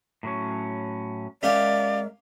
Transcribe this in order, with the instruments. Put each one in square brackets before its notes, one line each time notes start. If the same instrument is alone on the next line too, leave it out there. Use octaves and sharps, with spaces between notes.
[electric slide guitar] A2 F#3 C#4
[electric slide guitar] G#3 A#4 E5 [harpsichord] C#4 G4 F5 [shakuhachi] D5